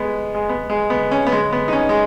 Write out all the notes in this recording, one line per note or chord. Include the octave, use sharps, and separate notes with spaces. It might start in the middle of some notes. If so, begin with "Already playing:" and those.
Already playing: G#3 B3
G#3
B3
G#3
B3
C#4
B3
G#3
B3
D#4
C#4
G#3